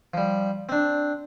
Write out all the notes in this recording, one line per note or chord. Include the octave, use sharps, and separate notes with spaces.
F3 G3
C4 D4